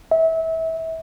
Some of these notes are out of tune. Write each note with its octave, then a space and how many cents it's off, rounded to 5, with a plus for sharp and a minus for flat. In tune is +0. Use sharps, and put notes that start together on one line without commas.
E5 -25